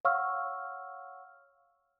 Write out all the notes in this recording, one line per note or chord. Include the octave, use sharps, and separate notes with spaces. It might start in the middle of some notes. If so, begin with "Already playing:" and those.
C#5 F5 F#5 C#6 E6 F6